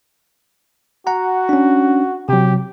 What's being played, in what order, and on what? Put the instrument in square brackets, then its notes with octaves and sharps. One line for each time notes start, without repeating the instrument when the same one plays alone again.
[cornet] F#4 [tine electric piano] F#5 A#5
[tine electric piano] C#4 D4
[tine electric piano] C3 F#3 [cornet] G4